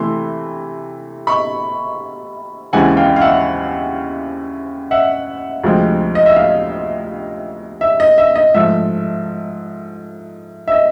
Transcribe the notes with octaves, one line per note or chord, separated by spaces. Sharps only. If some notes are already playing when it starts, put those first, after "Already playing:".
Already playing: C3 E3 A3 C6
B5 C#6
D#2 C#3 E3 G#3 C4 F#5 G#5
F5 G5
F5
E5 F#5
E5 F#5
D2 C3 F3 G#3 C4
D#5
E5
D#5 F5
E5
D#5
E5
D#5
G#2 F3 A3 E5
E5
D#5